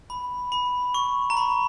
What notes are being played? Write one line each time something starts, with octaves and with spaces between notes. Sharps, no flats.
B5
B5
C#6
A#5
B5